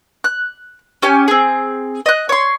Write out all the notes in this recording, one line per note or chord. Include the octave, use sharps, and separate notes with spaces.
F#6
C#4 G4 G#5
C4 G#4
D#5 F#6
C#5 C6